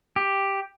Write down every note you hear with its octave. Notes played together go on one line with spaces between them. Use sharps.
G4